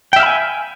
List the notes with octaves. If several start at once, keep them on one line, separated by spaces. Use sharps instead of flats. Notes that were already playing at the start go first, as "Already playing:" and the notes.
E5 F5 G5 G#5 B5